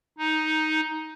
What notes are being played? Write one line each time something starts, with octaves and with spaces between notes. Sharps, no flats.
D#4